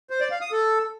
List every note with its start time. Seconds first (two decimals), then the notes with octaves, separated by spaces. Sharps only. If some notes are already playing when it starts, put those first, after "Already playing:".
0.10 C5
0.20 D5
0.31 F5
0.41 D#6
0.52 A4